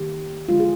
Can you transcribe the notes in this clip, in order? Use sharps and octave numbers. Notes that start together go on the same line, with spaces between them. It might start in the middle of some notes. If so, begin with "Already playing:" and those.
Already playing: D#3 A#3 G4
D3 F3 G#3 F4
G#4